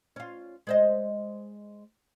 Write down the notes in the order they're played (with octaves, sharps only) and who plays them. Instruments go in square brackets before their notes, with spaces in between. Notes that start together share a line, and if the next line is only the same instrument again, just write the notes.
[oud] C#4 F4
G#3 C5 D#5